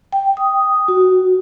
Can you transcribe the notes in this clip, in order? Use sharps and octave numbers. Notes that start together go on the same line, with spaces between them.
G5
D#6
F#4